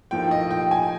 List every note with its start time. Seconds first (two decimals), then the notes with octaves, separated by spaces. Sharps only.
0.11 A2 F3 A#3 D#4 G5
0.31 D#5
0.51 G5
0.71 G#5